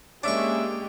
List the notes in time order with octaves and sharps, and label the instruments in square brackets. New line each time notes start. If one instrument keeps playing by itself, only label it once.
[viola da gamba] G#3 G4 [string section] A#3 [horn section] C#4 E5 [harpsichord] D4 C#6